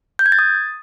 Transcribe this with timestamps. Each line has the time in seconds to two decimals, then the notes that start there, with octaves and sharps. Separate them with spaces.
0.19 G6
0.26 G#6
0.32 A6
0.39 D#6